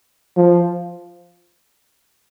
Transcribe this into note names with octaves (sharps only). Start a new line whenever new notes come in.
F3